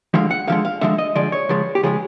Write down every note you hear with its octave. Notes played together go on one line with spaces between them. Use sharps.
D3 F3 G#3 F5
F#5
D3 F3 G#3 F5
F5
D3 F3 G#3 E5
D#5
D3 F3 G#3 D5
C#5
C#3 F3 G#3
G4
C#3 F3 G#3 G#4